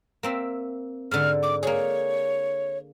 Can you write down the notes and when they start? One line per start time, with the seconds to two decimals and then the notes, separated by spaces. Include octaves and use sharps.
0.23 A#3 C4 E5
1.11 G#2 D3 F6
1.43 D6
1.63 A#3 G#4 C#5